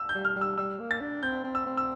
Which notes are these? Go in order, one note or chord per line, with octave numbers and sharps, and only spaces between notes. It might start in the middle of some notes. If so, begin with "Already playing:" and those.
Already playing: E6
G6
G3
F6
G3
E6
G3 E6
A#3
A6
D4
C4 G6
C4
E6
C4
E6